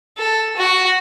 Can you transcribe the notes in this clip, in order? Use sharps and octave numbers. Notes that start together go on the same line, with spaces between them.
A4
F#4